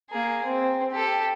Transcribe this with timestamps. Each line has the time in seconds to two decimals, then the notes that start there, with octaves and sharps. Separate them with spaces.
0.11 A#3 G#4
0.45 C4
0.91 G4 A4